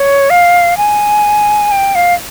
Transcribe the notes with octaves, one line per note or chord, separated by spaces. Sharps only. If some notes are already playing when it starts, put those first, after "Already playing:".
Already playing: C#5
F5
G#5
G5
F5